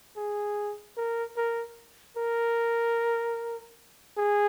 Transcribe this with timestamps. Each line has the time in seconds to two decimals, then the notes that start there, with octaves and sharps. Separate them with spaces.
0.17 G#4
0.97 A#4
1.37 A#4
2.17 A#4
4.17 G#4